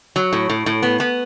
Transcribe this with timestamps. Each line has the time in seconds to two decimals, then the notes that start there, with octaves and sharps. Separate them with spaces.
0.16 F#3
0.33 A2
0.50 A2
0.66 A2
0.83 B3
1.00 B3